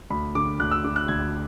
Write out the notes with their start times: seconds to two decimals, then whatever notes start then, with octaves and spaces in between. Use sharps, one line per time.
0.10 D2 B5
0.35 D3 D6
0.60 D2 F#6
0.71 E6
0.84 D3 D6
0.96 F#6
1.08 D2 G#6